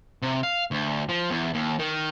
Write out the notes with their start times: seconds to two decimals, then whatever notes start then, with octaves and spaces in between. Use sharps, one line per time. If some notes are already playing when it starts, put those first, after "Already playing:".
0.22 C3
0.43 F5
0.71 D2
1.09 F3
1.30 E2
1.54 D#2
1.79 D#3